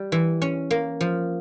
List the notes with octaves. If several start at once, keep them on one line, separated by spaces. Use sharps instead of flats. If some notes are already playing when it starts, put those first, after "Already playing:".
Already playing: G3
E3
C#4
A#3
F3